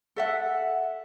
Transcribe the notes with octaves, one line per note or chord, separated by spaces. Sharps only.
A4 E5 F#5